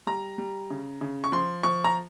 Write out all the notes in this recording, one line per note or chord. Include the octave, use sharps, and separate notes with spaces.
G3 A#5
G3
C#3
C#3
C#6
F3 C6
F3 C#6
A#5